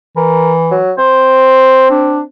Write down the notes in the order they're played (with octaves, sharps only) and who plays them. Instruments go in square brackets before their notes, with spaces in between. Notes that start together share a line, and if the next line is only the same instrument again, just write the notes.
[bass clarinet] E3 [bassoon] A#4
[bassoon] F#3
[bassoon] C4 [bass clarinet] C5
[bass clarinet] D4